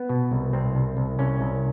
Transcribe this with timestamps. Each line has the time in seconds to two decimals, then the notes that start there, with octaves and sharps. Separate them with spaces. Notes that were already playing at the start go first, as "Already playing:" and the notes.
Already playing: B3
0.09 B2
0.32 C2
0.53 C2 C4
0.75 C2
0.97 C2
1.19 C2 C#4
1.41 C2